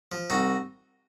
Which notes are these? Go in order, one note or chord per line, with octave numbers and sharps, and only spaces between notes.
F3
C2 D#4 F#4